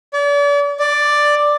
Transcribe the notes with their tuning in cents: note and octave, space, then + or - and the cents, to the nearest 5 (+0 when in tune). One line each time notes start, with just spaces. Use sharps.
D5 -40
D5 +5